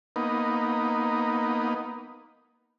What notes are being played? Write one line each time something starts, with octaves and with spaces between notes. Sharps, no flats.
A#3 B3 D#4